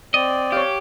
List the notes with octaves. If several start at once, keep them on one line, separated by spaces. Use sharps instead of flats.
C4 D5 D#5
G4 C#5 F5